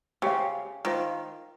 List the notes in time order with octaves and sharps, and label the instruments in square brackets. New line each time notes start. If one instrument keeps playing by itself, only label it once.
[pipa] C#3 [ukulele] G4 C5 F5
[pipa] D#3 [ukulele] F4 C5 F5